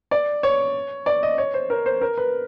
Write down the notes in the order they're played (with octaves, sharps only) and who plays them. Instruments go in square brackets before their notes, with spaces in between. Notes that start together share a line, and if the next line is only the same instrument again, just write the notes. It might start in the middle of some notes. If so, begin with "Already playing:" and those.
[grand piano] D5
C#5
D5
D#5
C#5
C5
A#4
C5
A#4
B4